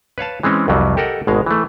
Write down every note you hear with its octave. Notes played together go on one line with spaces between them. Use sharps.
B4 C#5 F5 A5
E3 G#3 C4 C#4
C2 F2 F#3 G3
G4 A4 A#4 D#5 F#5
G#1 B2 G#3 F5
E3 A3